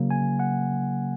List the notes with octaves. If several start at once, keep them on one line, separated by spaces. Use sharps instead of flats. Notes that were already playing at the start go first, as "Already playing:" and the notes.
Already playing: C#3 F#3 A#3
G#5
F#5